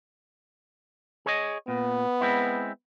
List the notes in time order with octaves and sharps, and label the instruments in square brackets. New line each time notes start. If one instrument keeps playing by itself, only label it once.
[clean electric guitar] G#4 C#5 D#5
[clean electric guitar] A#2 [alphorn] B3
[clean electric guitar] G#3 C4 E4